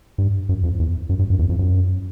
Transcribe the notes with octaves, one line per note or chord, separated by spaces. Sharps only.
G2
F#2
F2
E2
F#2
G2
F#2
E2
F2
F#2